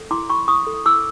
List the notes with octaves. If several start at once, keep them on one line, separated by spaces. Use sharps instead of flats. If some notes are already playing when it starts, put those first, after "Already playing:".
Already playing: A4
E4 C6 D6
E4 B5 C#6
E4 C#6 D#6
A4
E4 D6 E6